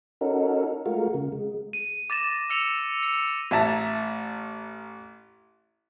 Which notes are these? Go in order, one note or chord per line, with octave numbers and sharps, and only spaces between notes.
C#4 D#4 F#4 A4 A#4
G#3 A3 F4 F#4 A#4
C#3
G#3
D#7
D6 A6 A#6 E7
D6 E6 C#7 F7
C#7
A1 E5 A5 A#5